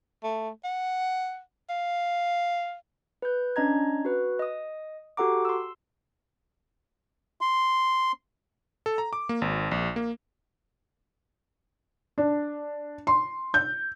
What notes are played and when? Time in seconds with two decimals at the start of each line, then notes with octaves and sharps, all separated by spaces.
0.24 A3
0.64 F#5
1.70 F5
3.22 B4 G6
3.56 C#4 D4 D#5 A#5 G#6
4.05 F#4 B4
4.39 D#5 D#6
5.17 F#4 G4 A4 F#5 A#5 D6
5.45 C6 E6
7.41 C6
8.86 A4
8.98 A#5
9.13 D6
9.29 A#3
9.42 G#1
9.71 A#1
9.96 A#3
12.18 D4
13.07 C6
13.54 G6